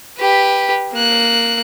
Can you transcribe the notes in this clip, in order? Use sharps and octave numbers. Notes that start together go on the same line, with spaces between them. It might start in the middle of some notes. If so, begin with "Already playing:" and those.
G4 B4
A#3 F#6